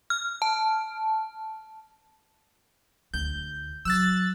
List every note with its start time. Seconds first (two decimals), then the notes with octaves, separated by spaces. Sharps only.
0.10 F6
0.42 A5
3.14 D2 G6
3.85 F#3 E6 F#6 A6